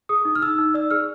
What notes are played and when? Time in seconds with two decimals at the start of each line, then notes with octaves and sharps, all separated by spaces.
0.09 G#4 D#6
0.25 D#4
0.35 F6
0.42 D#4 E6
0.58 D#4
0.74 D5 E6
0.91 G#4 F6